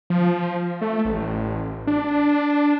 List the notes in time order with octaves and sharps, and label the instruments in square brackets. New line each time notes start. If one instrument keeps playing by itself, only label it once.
[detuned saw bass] F3
A3
A1
D4